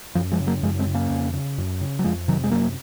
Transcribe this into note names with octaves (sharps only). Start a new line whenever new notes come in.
F#2 F3
F3 G#3
C#3
F#3 A#3
F#2 F3 G#3
G#3 C4
C#3
A#3 C#4
F2
C#3
F#2
C#3
F#3
F2 F3 G#3
C3 D#3 F#3
G#3
F#2 F#3 A#3